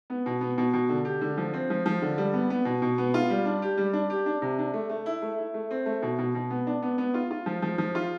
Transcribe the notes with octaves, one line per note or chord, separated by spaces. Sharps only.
B3
B2
B3
B2
B2
D3
G4
D3
F3
C4
F3
F3
D3
G3
B3
B3
B2
B2
B3
F4
G3
D4
G4
G3
D4
G4
D4
C3
D4
A3
A3
E4
A3
E4
A3
C4
A3
B2
B2
B2
B3
D4
B3
B3
F4
F4
F3
F3
F3
F4